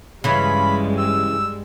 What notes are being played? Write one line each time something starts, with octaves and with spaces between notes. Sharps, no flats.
G2 C#3 E3 G3 G#3 B5
E6